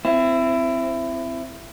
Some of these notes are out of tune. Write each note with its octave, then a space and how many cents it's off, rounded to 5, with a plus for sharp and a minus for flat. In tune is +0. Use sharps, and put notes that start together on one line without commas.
C4 -10 E4 +20